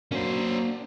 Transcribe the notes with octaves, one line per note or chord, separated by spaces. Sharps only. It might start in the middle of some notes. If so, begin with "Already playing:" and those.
F#3 A#3 C#4 D4 C5